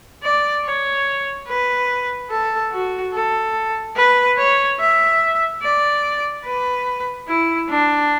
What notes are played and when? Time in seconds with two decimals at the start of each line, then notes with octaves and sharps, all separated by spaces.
0.23 D5
0.65 C#5
1.48 B4
2.30 A4
2.72 F#4
3.14 A4
3.97 B4
4.38 C#5
4.79 E5
5.63 D5
6.45 B4
7.28 E4
7.70 D4